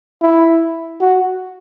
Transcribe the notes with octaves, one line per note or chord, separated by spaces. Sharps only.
E4
F#4